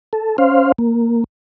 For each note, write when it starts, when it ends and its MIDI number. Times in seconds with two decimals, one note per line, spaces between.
0.13 0.37 69
0.38 0.72 61
0.38 0.72 72
0.38 0.72 77
0.78 1.24 58